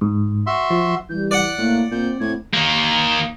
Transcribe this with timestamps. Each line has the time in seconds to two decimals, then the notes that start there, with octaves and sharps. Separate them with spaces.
0.01 G#2
0.47 F#4 E5 C6
0.70 F3
1.10 E3 G3 G6
1.31 D5 F#5 F#6
1.58 A2 A#3
1.92 A#2 C4 G6
2.20 A2 C4 G#6
2.54 D#3 A#3